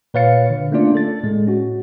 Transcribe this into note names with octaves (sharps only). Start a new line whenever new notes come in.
A#2 B4 C#5 F5 A6 C#7
D3
A3 A#3 C#4 D4 F4 D5
A4 A6
A2 G#3
C#4 F#4